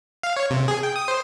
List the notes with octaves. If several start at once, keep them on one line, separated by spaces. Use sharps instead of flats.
F5
C#5
C3
G#4
G5
D#6
C5